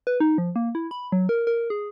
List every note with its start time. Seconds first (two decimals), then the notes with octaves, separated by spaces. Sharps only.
0.07 B4
0.20 D#4
0.38 F3
0.56 A#3
0.75 E4
0.91 B5
1.12 F#3
1.29 A#4
1.47 A#4
1.70 G#4